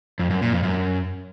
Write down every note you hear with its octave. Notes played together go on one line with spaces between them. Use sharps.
F2
F#2
A#2
F2
F#2